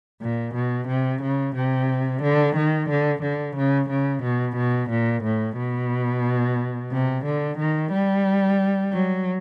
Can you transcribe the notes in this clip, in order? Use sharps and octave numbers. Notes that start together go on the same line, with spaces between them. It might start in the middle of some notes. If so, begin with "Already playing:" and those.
A#2
B2
C3
C#3
C3
D3
D#3
D3
D3
C#3
C#3
B2
B2
A#2
A2
B2
C3
D3
D#3
G3
F#3